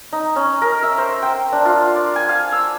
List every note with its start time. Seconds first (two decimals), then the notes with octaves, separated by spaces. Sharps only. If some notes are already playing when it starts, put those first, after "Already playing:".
0.13 D#4
0.36 C#4
0.62 A#4
0.83 E5
0.98 C5
1.22 G5
1.52 D4
1.65 F4
1.96 D5
2.16 G#5
2.29 F5
2.52 E6